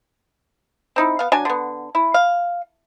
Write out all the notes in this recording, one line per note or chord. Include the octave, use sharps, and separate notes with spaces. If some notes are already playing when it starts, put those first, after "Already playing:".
C4 D#4 E4
B3 F5
F#3 D4 G#5
D3 B3
E4
F5